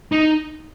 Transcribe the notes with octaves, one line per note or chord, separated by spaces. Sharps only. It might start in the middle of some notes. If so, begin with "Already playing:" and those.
D#4